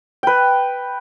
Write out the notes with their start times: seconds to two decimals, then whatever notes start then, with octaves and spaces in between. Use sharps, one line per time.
0.23 B4 G5